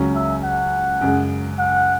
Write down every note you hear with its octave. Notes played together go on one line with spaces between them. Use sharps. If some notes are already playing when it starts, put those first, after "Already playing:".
Already playing: C#2 C#3 F#3 C#4
E5
F#5
F#2 C#3 G#3
F#5